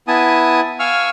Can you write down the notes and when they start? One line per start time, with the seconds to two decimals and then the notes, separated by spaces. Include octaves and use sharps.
0.08 B3 E4 G#5 A5 D#6
0.79 F5 G#5 C#6 E6 F6